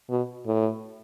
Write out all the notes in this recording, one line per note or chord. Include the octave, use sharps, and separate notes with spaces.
B2
A2